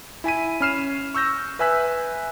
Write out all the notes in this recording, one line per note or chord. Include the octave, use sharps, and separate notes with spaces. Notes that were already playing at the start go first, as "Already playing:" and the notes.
E4 G#5 B6 D#7
C#4 B5 F6 C7 E7
C#6 E6 G6 A#6
B4 E5 G#5 E6 F#6 B6